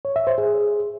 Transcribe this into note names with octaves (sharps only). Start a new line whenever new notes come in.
C#5
E5
C5
G#4